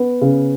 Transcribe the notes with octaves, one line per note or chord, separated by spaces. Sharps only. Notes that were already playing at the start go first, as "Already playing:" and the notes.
Already playing: B3
C#3